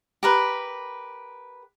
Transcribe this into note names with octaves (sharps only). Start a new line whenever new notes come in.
G4 A#4 B4